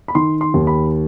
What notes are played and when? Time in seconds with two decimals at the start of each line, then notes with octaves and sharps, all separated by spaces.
0.08 B5
0.15 D#3 C6
0.41 C6
0.54 D#2
0.67 B5